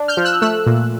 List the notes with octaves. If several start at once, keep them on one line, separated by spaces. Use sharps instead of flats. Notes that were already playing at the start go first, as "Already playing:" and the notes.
Already playing: D4
F6 G6
F3
E6 F#6
A3 E6 F#6
A#2